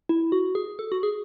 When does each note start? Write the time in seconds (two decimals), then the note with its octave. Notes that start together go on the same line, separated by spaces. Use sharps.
0.09 E4
0.32 F#4
0.55 G#4
0.79 A4
0.92 F#4
1.03 G#4